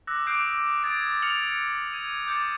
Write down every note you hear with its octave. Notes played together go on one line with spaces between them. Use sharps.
D6 E6 F#6 A#6
D6 D#6 F#6 G6 C7 D7
D#6 G#6 A6 D7
F6 A6 C#7 F7 F#7
G#6 D#7
D6 G6 A6 C#7